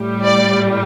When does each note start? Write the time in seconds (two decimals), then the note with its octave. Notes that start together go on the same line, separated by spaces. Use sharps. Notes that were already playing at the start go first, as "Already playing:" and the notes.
Already playing: A2 G3
0.24 D5